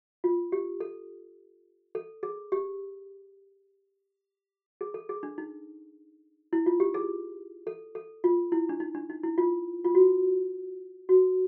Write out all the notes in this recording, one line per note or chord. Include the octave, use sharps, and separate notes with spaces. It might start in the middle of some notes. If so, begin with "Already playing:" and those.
F4
G4
A4
A4
G#4
G4
G#4
A4
G#4
D4
D#4
E4
F4
G4
G#4
A4
A4
F4
E4
D4
D#4
D4
D#4
E4
F4
F4
F#4
F#4